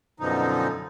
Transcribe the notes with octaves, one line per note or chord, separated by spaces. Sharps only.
F#2 B2 D3 F3 D#4